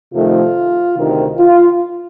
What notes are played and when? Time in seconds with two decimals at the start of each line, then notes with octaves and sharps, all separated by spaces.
0.13 F2 C3 D#3 A3 F4
0.96 D2 C3 D#3
1.38 F4